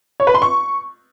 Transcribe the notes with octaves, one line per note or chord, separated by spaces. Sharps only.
C#5
B4
C6
C#6